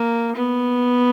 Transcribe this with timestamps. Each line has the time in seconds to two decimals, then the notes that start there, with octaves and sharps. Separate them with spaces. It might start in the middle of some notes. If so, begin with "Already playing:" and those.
Already playing: A#3
0.35 B3